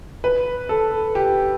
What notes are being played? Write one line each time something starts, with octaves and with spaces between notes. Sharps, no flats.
B4
A4
G4